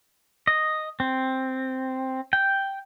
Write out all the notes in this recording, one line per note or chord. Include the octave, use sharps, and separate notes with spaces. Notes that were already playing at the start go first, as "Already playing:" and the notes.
D#5
C4
G5